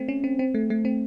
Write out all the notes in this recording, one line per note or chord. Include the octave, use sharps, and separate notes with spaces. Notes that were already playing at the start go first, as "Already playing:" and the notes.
Already playing: A3 C4
C#4
C4
C4
A3
A3
C4